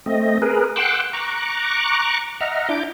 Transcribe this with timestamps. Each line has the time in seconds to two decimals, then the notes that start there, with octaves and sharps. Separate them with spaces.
0.06 A3 C4 D#5
0.42 G#4 A#4 B4
0.76 F#5 G5 C6 D6 E6 F#6
1.13 A#5 C#6 D6 F#6
2.40 D#5 E5 F#5 A#5 F6
2.69 D4 E4 D6 G6